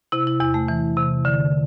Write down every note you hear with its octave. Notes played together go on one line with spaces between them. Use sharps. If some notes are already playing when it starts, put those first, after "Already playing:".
C3 E4
E4
E2 E4
A3
E3
C3
D3